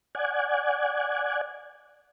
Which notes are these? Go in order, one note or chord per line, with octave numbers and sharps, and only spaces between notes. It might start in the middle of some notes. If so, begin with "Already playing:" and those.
D5 F#5 G#5